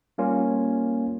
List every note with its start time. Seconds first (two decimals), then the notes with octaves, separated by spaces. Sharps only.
0.18 G3 A#3 C#4 F4